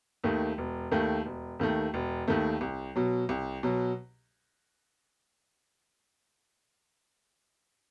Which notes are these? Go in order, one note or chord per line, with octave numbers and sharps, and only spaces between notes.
D#2 D#3 A3
E1
D#2 D#3 A3
E1
D#2 D#3 A3
E1
D#2 D#3 A3
C2
B2 F#3
C2
B2 F#3